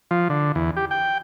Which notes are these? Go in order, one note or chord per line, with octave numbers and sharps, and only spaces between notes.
F3
D3
E2
G4
G5